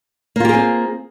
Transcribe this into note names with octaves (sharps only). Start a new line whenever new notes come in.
A#3 C4 F4 G4 G#4